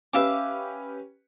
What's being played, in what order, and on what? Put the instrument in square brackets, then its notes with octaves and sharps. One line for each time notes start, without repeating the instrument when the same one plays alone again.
[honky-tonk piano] C#4 G4 B4 [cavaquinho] E5 F5 D6